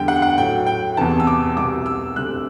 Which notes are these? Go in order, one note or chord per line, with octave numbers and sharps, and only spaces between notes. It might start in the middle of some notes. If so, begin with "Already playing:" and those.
Already playing: E2 D3 G3 G5
F#5
F#5
A2 F#3 G5
G5
E2 C3 E3 A5
E6
D6
C2 B2 G3 D6
E6
D2 C3 G3 F#6